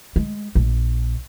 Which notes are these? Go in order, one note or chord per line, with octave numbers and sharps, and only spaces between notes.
G#3
A#1